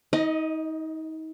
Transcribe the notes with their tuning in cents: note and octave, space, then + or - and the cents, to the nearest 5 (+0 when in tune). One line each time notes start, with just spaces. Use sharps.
D#4 +35 D#5 +0